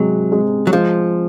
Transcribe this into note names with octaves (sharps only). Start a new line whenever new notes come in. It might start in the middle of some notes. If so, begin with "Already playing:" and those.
Already playing: C3 F#3 G#3
G#3
F#3
F3 G#3